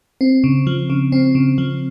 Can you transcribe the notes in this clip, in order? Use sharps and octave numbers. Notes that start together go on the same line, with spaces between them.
C4
C#3
F3
C#3
C4
C#3
F3